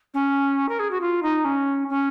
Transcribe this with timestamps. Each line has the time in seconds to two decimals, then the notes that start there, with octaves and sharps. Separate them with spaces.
0.14 C#4
0.69 A#4
0.79 G#4
0.91 F#4
1.01 F4
1.22 D#4
1.45 C#4
1.89 C#4